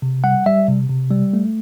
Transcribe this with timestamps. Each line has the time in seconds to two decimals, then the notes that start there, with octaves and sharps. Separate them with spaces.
0.02 C3
0.24 G3 F#5
0.46 G3 E5
0.68 C3
0.89 C3
1.11 G3
1.33 A3